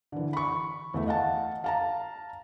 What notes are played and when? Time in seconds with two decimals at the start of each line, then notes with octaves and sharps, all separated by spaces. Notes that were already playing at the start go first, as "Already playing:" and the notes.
0.12 D3 E3
0.33 B5 C#6
0.94 E2 A3 E5
1.06 D#5 F5 F#5 A5
1.64 F5 A5 A#5